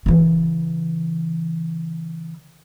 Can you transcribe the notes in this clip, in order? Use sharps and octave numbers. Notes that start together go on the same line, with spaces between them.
C#3 E3